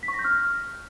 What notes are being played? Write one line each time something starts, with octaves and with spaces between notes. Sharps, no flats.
B6
C#6
A#6
G6
F6